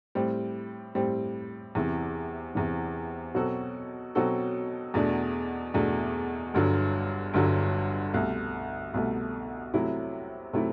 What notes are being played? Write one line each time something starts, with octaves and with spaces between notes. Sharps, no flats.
A2 G3 C4
A2 G3 C4
E2 C3 E3
E2 C3 E3
B2 F#3 C4 F#4 A4
B2 F#3 C4 F#4 A4
E2 B2 A3 D4
E2 B2 A3 D4
G1 G2 D3 F#3
G1 G2 D3 F#3
C2 B2 A3
C2 B2 A3
C3 F#3 A3 E4
C3 F#3 A3 E4